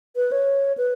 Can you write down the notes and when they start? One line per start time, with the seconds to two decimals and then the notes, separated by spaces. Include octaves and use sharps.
0.16 B4
0.32 C#5
0.78 B4